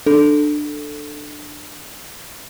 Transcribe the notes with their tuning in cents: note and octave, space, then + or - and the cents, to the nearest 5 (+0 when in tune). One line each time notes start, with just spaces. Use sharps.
D4 +20 A4 +0